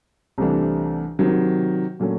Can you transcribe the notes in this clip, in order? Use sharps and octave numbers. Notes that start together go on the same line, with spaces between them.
C2 C3 E3 A3 D4
C3 D#3 F#3
A#2 F#3 A3 C#4